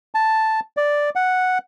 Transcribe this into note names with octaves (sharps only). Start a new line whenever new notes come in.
A5
D5
F#5